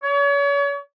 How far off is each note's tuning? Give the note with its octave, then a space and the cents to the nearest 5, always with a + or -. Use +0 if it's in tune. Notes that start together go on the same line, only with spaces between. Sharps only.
C#5 +35